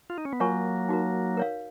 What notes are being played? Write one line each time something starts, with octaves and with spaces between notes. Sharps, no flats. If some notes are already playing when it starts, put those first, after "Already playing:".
F4
D#4
C#4
B3
F#3 A#3 F4 A#4 C#5 G#5 C#6
D#4 F#4 A#4
A#4 C#5 F5